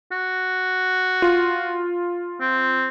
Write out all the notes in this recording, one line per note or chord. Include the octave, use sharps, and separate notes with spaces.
F#4
F4
C4